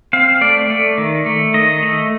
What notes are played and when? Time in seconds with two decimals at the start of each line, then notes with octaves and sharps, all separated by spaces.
0.13 C4 F5
0.41 A3 D5
0.70 A3
0.98 D#3
1.26 A3
1.54 D#3 D#5
1.82 A3